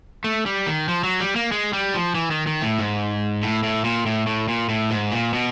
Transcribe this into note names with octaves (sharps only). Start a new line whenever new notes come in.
A3
G3
D#3
F3
F#3
G3
A#3
G#3
G3
F3
E3
D#3
D#3
A2
G#2
A2
A2
A#2
A2
A2
A#2
A2
G#2
A#2
B2